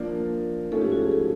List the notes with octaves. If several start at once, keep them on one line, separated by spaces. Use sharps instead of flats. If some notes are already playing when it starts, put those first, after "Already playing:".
Already playing: F3 A#3 D4
G#2 F3 A3 C#4 A4
G4
F#4
G#4
A4